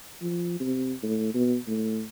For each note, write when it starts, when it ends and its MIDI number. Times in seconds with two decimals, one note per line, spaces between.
0.21 0.57 53
0.60 0.93 48
1.03 1.31 45
1.34 1.57 47
1.67 2.03 45